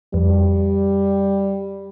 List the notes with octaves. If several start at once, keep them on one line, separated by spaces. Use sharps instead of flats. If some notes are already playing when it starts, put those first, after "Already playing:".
F2 G3